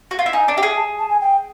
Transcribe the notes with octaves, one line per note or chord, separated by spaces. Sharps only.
F#4
F4
E4
D#4 G#5
D4
G4 E5
G#4
A5
A5
G#5
G5